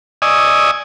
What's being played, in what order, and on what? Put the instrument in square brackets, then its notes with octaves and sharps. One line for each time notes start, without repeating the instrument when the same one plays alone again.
[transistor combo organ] D5 D#5 G#5 C#6 D#6 E6